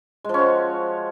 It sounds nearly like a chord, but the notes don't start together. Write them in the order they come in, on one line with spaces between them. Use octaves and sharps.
G#3 F3 C#4 F#4